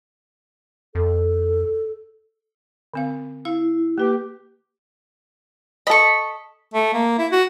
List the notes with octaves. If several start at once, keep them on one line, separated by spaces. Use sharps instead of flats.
F2 A4
D3 C4 F5
E4 F5
A#3 G4 B4
A4 D#5 B5 C#6
A3
A#3
E4
F#4